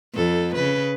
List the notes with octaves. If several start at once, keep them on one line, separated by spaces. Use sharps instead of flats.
F2 A4
C#3 B4